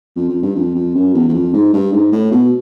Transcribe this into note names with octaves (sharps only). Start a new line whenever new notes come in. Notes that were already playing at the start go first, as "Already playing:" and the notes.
F2
F2
G2
F2
F2
F#2
E2
E2
F2
G#2
G2
G#2
A2
B2